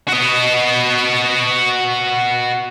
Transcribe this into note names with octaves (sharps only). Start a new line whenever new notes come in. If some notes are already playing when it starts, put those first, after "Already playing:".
F#4 D#5